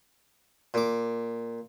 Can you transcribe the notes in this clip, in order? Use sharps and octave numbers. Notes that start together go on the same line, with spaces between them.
A#2 D6